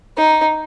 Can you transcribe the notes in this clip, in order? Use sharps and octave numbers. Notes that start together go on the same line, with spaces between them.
D#4